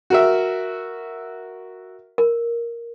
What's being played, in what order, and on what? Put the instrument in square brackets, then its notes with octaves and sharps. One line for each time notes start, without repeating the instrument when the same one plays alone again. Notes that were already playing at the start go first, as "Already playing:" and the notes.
[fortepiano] F#4 A#4 E5
[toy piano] A#4